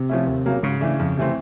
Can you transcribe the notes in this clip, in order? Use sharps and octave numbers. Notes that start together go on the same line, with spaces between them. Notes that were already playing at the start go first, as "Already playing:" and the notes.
Already playing: C3
F3 A3 C#4 E4
D#2
C#3 F#3 A#3
G#2 C#3
E3 A3 D4
F2
C3 E3 A3 C4